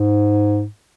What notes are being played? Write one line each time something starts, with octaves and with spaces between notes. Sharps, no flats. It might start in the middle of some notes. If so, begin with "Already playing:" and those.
Already playing: G#2